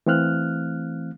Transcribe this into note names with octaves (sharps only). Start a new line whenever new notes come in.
E3 A3 C4 F5 F6 F#6